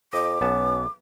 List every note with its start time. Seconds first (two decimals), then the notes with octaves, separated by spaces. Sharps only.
0.13 F2 D#5 D6
0.41 B1 B3 C#4 A5